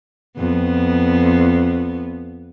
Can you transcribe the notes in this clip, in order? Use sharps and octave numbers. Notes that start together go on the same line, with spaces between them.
F2 B3